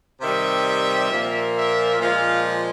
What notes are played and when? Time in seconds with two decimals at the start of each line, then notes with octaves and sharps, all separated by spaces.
0.21 C3 D#3 G3 E5
1.11 A#2 F3 A#3
1.56 E5
2.00 A#2 F3 G#3 F5